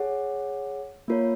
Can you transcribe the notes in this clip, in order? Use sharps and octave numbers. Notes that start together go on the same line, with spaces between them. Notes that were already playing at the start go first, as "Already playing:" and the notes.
Already playing: G#4 C#5 F#5
A#3 F4 A#4 C#5